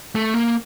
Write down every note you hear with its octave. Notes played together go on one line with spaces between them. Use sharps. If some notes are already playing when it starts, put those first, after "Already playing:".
A3
A#3